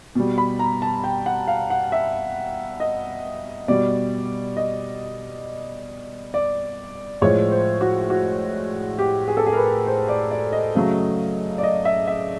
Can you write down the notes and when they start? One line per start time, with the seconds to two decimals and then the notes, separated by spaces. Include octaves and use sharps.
0.15 B2 G3
0.38 B5
0.59 A#5
0.82 A5
1.04 G5
1.26 F#5
1.47 F5
1.70 F#5
1.92 E5
2.80 D#5
3.68 B2 G3 D5
4.57 D#5
6.34 D5
7.22 A2 F3 G#3 C#5
7.51 C5
7.81 F#4
8.10 F#4
8.99 G4
9.28 G#4
9.37 A4
9.47 G#4
9.53 A#4
9.57 B4
9.87 C5
10.08 D5
10.31 D5
10.53 D#5
10.75 C#3 F#3 A3
11.58 D5
11.63 D#5
11.85 E5
12.07 E5